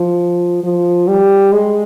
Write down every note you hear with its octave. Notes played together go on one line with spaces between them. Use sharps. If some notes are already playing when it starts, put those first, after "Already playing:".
Already playing: F3
F3
G3
G#3